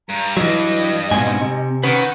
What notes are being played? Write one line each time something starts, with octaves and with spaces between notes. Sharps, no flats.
G2 A#5
G2 E3 F#3 D#5
G#2 B2 C4 G#5
C3
D#3 C#4 B4 F#5